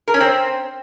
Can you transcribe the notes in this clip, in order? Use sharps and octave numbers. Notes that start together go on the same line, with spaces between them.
A#4
C#4
C4